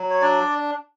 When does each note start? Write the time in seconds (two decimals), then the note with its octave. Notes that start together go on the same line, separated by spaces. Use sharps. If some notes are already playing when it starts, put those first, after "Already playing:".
Already playing: F#3
0.10 C#5
0.21 D4 D5